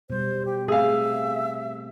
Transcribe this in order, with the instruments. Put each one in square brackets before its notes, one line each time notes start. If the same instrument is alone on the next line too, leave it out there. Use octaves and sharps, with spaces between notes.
[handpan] B2 G3 [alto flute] C5
[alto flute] G4
[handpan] A3 C4 [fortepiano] G#4 F5 [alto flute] E5